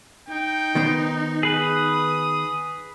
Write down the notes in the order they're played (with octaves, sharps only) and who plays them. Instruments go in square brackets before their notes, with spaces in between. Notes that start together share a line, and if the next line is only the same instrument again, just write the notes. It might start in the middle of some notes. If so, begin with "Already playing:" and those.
[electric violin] D#4 [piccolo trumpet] G5
[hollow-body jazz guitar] D#3 B3 C5
[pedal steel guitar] G#4 B4 [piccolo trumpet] D#6